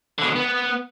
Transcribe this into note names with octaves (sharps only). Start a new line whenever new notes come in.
B2 D3
B3